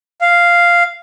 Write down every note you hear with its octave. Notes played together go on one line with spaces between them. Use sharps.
F5